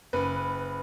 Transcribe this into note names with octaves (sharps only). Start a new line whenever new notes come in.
F#1 B4